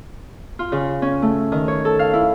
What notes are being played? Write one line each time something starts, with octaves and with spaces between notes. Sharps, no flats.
F4
C#3
C#4
A3
D#3
C#5
A4
F5
E4